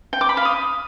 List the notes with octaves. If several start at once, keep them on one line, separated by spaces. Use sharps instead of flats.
G5
D6
B5
F5
D#6